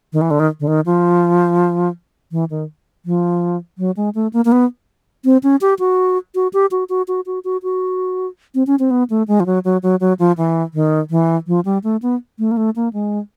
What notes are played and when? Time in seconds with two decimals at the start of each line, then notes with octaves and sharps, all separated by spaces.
0.13 D#3
0.21 E3
0.31 D3
0.40 D#3
0.60 D3
0.68 D#3
0.86 F3
2.32 E3
2.50 D#3
3.06 F3
3.78 F#3
3.97 G#3
4.15 A3
4.33 A#3
4.45 A#3
4.52 B3
5.25 C4
5.43 C#4
5.61 G4
5.79 F#4
6.35 F#4
6.53 G4
6.71 F#4
6.89 F#4
7.08 F#4
7.26 F#4
7.45 F#4
7.63 F#4
8.55 C4
8.67 C#4
8.79 C4
8.91 B3
9.10 A3
9.28 G#3
9.40 F3
9.46 F#3
9.65 F#3
9.83 F#3
10.00 F#3
10.19 F3
10.37 E3
10.74 D#3
11.10 E3
11.47 F3
11.65 G3
11.84 A3
12.02 B3
12.39 A3
12.51 A#3
12.57 A3
12.76 A#3
12.93 G#3